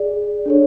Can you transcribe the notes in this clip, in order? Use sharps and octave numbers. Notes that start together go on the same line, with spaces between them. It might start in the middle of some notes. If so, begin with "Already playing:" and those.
Already playing: G#4 D5
D4 A4 C#5